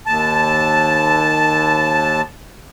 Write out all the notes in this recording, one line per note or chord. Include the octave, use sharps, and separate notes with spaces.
D#2 A5